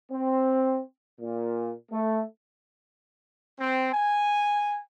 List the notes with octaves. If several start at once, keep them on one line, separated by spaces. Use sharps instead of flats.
C4
A#2
A3
C4
G#5